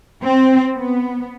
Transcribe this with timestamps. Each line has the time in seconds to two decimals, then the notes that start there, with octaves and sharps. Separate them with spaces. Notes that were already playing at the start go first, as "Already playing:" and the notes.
0.23 C4
0.75 B3